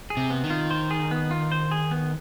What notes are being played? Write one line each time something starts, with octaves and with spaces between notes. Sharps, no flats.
G#4
C3
B3
D#3
F4
C5
G#4
B3
F4
C5
G#4
B3